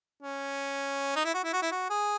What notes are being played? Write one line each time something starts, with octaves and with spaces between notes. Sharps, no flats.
C#4
D#4
E4
F#4
E4
F#4
E4
F#4
G#4